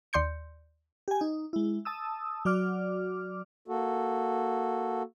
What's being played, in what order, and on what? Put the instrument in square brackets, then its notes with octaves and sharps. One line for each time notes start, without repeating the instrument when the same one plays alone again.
[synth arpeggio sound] D#2 D5 C6 G6 C#7
[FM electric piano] G4 G#5
D#4
G#3 E4
A5 D#6 E6
F#3 F#4 D5 D6 F6
[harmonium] A#3 F#4 A4